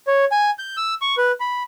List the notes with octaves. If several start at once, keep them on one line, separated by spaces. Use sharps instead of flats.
C#5
G#5
G6
E6
C#6
B4
B5